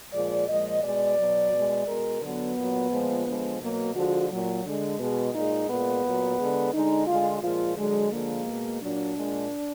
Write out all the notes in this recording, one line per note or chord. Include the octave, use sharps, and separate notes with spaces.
A#2 F3 G#3 D5
A#2 F3 G#3 D#5
B2 G#3 D5
B2 F#3
B2 G#3
B2 G#3 A#4
D3 F#3 B3
A#2 F#3
A#2 F3 G#3
D3 F3 G#3
B2 F#3 A#3
D3 F3 G#3 F#4
A#2 F#3
D3 G#3
B2 G#3
A#2 G#3 D#4
A#2 G#3 B3
A#2 F#3
D3 G#3
D3 G#3 D#4
D3 G#3 F4
A#2 F3 G#3 F4
D3 F#3 G#3
D3 F3 G#3 A#3
B2 G#3
A#2 F#3 D4
A#2 G#3